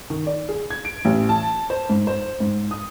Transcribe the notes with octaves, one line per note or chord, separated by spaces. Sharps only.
D#3
D5
G#4
G#6
D7
A1
A5
C5
G#2
C5
G#2
D#6